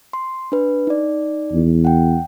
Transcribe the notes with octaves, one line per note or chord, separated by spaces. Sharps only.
C6
D4 B4
D#4 D5
E2
F#5 G5